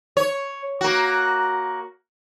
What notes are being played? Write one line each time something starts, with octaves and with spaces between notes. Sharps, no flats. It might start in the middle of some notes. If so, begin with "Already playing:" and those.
C#5
A#3 F#4